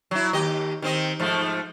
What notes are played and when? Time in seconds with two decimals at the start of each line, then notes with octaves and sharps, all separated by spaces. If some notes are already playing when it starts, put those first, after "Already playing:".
0.11 F#3 E4
0.33 D#2 G4 D#5
0.82 D#3 C4 D#5
1.20 G#2 F3 A3